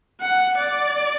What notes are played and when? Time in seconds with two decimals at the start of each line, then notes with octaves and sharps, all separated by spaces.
0.21 F#5
0.57 D5